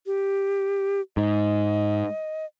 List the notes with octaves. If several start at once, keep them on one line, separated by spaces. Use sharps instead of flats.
G4
G#2 D#5